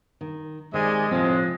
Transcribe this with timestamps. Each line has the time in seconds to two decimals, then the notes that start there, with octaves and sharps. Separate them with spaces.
0.21 D#3
0.74 C3 D#3 G#3 G4 D5 D#5 G#5
1.11 F2 A2 C3 F3 G#3 C4